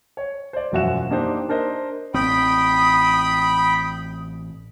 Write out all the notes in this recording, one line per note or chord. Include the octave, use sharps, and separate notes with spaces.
C#5
C5 D5
E1 F#2 F3 F#4 E5 E7
A#3 D4 D#4 G4 C5
D4 A#4 C5 D#5
A1 C4 G5 B5 D#6